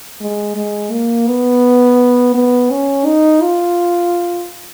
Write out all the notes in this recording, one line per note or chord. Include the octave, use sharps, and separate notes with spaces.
G#3
G#3
A#3
B3
B3
C#4
D#4
F4